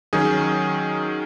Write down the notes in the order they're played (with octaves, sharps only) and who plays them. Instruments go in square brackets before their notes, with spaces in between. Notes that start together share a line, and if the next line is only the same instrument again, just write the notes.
[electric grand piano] D#3 F#3 C#4 G#4